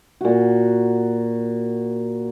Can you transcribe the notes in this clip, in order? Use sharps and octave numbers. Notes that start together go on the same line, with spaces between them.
A#2 F#4